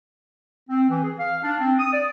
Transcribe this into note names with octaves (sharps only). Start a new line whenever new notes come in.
C4
E3
G#4
F5
D4
C4
D#6
D5